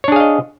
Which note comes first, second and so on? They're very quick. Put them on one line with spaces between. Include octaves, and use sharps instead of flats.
C#5 D4 G#4 F5 D#5